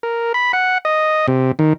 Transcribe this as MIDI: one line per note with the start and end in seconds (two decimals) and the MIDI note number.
0.03 0.33 70
0.34 0.52 83
0.53 0.78 78
0.85 1.27 75
1.28 1.52 48
1.59 1.73 51